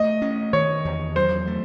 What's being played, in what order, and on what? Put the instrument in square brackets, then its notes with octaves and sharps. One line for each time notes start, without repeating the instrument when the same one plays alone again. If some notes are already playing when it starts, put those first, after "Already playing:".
Already playing: [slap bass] A3 [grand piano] D#5
[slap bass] C#4
[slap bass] D#3 [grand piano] C#5
[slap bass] E2
[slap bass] F#3 [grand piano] C5
[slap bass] A3